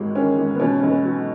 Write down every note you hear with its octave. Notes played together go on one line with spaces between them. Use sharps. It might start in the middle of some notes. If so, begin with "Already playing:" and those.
Already playing: G#1 G#2 D#3 F#3 G#3
D#3 C#4
G#1
B3
B2 C#4
B1 C#4
B3
F#3